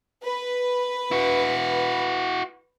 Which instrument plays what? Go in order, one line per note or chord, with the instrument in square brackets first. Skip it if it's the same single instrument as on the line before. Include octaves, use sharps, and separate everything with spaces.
[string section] B4
[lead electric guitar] E4 F#4